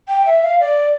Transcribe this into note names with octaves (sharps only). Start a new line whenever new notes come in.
G5
E5
F5
D5